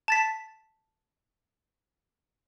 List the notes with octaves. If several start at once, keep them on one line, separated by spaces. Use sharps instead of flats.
A5 A6 B6